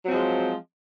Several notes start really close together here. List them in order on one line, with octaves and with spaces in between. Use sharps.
F#3 C4 F3 G#3